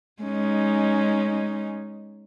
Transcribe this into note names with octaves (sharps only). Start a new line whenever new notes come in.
G#3 C#4 D#4